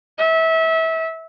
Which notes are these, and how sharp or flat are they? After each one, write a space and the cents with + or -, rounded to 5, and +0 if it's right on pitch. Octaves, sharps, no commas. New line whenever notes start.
E5 -25